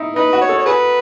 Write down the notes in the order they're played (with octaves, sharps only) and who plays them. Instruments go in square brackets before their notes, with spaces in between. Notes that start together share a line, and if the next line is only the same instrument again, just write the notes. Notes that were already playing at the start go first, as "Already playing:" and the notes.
Already playing: [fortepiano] D#4 E4
[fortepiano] D#4 [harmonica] B4
[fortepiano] F#4
[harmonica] C#5
[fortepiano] A4
[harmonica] C#5
G#4 B4